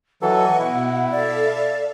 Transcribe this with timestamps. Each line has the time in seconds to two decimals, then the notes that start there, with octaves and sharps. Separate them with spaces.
0.22 E3 F#3 A4 D#5 F#5 C#6
0.59 B2 E4
1.11 A4 D5 E5 F5